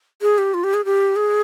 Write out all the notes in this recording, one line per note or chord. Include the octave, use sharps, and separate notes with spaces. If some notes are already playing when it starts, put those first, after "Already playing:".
G#4
G4
F4
G4
G#4
G4
G#4